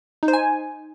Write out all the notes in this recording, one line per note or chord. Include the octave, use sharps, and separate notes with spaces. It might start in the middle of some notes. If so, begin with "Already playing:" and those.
D#4
C5
G#5